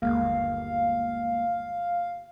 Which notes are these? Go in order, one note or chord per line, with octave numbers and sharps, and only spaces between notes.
G1 D#2 G#3 A#3 F5